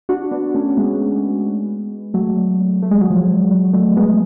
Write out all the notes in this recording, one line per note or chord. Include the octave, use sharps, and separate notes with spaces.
D4 F#4
B3 D4
A3 C#4
G#3 B3
F#3 A3
A3
G#3
F#3
F3 G#3
F#3
F#3 A3
G#3 B3